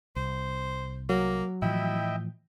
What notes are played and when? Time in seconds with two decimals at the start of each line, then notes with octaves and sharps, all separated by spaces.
0.16 C2 C5
1.10 F#3 A#3
1.62 A2 E3 F3 E4 D#5 E5 G5